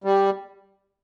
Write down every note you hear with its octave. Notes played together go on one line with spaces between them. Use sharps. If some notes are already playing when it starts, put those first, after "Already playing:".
G3